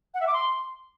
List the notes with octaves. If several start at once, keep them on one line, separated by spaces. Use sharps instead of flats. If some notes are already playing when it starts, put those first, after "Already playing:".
F#5
E5
D6
C6